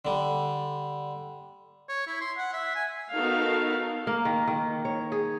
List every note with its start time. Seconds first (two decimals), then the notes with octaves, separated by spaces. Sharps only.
0.05 D3 G3
1.89 C#5
2.07 E4
2.21 C6
2.37 F#5
2.53 E5
2.75 G#5
3.12 B3 D#4 F#4 A4 A#4 F5
4.07 A#3
4.25 D#3
4.48 D#3
4.85 C#5
5.12 G#4